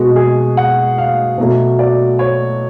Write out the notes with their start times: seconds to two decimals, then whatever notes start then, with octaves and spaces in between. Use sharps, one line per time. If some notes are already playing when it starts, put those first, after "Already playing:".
Already playing: B2 G#3 F#4
0.16 G#4
0.57 F#5
0.98 F5
1.38 B2 F#3 A3
1.79 D5
2.19 C#5